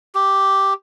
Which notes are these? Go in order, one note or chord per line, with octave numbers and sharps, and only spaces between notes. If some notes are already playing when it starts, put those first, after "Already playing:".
G4